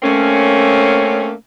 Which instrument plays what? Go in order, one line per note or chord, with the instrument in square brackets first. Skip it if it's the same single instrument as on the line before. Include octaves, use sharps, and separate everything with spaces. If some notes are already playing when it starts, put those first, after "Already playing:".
[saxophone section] A3 A#3 C4 C#4